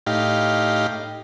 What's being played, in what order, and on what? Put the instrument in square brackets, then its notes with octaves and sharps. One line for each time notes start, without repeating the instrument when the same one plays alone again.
[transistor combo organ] A2 D#4 G4 F5